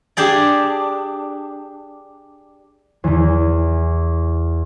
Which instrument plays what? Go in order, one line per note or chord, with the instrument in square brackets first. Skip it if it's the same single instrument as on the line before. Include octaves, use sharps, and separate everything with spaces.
[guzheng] D4 G4 G#4 D5
[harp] E2 E3